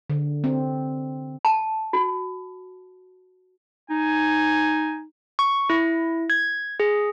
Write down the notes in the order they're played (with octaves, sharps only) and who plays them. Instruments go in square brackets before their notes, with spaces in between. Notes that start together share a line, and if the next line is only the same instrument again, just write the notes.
[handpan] D3
C4
[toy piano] A5
F#4
[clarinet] D#4 [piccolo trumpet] G#5
[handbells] C#6
E4
G#6
G#4